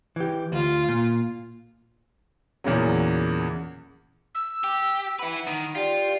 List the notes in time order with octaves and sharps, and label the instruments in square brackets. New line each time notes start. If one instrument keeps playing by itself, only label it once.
[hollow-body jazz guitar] E3 G4
[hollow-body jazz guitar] D2 [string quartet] F4
[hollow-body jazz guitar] A#2
[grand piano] E2 A#2 C#3 F#3
[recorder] E6
[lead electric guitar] G4
[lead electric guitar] E4 B4 [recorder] F#5
[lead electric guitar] D#3
[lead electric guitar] F4 [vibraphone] G4 D5 [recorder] G5